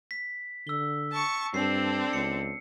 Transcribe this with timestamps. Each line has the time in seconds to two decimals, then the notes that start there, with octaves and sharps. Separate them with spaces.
0.11 B6
0.67 D3 E6 G7
1.13 A5 C#6
1.54 G2 C4 D4 A4 C7
2.13 C#2 C#7